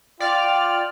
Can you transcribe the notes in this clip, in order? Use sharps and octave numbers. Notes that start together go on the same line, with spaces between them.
F4 D5 G5 F6